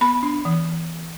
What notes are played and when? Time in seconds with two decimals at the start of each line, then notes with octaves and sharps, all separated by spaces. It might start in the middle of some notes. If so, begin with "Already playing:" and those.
0.01 B3 B5
0.23 D4
0.45 E3